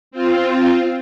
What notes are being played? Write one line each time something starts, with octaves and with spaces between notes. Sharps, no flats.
C4 F4